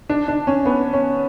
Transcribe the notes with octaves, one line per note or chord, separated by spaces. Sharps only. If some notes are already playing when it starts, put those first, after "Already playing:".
D4
D4
C#4
B3
C#4